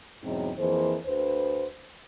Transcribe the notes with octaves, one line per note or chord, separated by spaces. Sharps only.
E2 G#2 B2 F#3 C4 D#4
F2 E3 A#3 G#4 C5
D2 B4 C5